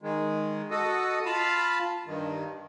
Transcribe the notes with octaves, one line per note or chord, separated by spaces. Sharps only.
D#3 G#3
F#4 A4 D#5
F4 F5 A5 B5
G2 D#3